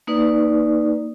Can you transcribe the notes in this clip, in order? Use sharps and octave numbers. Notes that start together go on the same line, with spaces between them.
A#3 D#4 B4 D5